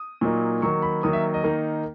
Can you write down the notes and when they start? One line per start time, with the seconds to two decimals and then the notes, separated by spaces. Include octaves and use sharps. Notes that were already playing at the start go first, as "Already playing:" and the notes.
Already playing: D#6
0.21 A#2 F#3 A#3 D#4
0.62 D#3 F#3 A#3 C#6
0.82 B5
1.03 D#3 F#3 A#3 D#6
1.13 E5
1.34 D#5
1.44 D#3 A#3 D#4